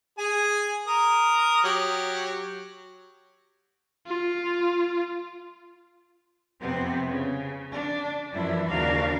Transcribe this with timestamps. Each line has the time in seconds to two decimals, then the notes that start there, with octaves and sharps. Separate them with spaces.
0.18 G#4 G#5
0.87 A#4 D#6
1.64 F#3 G4
4.07 F4
6.60 F2 C3 B3 C4
7.07 C#3
7.71 D4
8.33 F#2 E3 F3 D4 E4
8.69 D#2 C#3 D4 F#4 A#4 F5